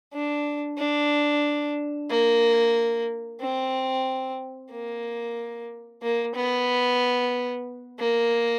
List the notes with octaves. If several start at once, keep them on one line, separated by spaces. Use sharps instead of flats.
D4
D4
A#3
C4
A#3
A#3
B3
A#3